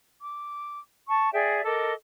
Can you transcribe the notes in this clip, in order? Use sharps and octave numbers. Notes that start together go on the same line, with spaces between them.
D6
A5 C#6
G#4 D5 E5 G5
A4 A#4 D#5 D6